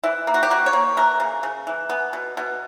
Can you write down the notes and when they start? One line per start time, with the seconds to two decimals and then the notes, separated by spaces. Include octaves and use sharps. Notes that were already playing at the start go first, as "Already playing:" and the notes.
0.04 E3 E4
0.27 A#3
0.34 F#4
0.43 G4
0.50 A#3 F#4
0.66 C#5
0.73 A#3
0.97 E3 A#4
1.20 C#3
1.43 C#3
1.67 E3
1.89 B3
2.13 B2
2.37 B2